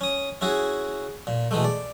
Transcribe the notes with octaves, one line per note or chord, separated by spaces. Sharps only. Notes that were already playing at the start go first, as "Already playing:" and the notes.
C#4 D#6
C#4 E4 F#4 G#4
A#2
B2 E3 G#3 A3
D5